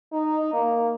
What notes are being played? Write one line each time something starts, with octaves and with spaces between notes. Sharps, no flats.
D#4
A#3